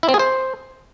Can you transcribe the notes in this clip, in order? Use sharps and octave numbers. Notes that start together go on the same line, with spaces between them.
E4
C4
G#4
C5